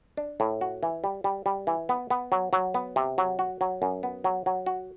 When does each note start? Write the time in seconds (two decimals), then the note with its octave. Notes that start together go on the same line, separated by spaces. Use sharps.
0.17 D4
0.40 A2
0.61 F#4
0.83 E3
1.04 G3
1.24 G3
1.46 G3
1.67 E3
1.89 B3
2.10 B3
2.32 F#3
2.53 F#3
2.74 B3
2.96 C3
3.18 F#3
3.39 F#4
3.61 F#3
3.82 F#2
4.03 B3
4.24 F#3
4.46 F#3
4.66 F#4